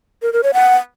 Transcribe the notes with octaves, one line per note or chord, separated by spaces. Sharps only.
A#4
A#4
C#5
F#5